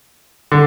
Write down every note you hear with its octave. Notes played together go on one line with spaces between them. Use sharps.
D3